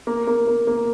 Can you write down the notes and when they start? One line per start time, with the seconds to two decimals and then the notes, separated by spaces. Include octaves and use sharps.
0.07 A#3
0.27 A#3
0.47 A#3
0.67 A#3